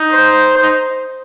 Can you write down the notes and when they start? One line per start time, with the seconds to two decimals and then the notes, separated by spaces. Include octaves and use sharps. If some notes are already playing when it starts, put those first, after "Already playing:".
Already playing: D#4
0.11 C5
0.63 D#4